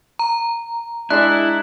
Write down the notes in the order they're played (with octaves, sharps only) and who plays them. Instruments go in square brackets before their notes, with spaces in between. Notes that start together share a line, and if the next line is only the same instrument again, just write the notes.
[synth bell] A#5
[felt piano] G#3 D4 [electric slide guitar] E4 [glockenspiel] F#6